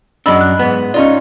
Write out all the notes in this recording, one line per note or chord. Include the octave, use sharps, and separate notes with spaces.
F#2 D4 D#5 B5 E6
F#6
G#2 B3
C#4 D#4 F4 D5 D#5